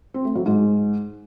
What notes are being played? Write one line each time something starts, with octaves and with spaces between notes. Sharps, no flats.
C4
A3
F#3
G#2